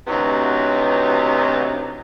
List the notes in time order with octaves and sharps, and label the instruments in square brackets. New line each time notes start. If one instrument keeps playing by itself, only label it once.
[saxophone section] D2 C3 E3 F#3 B3 D#4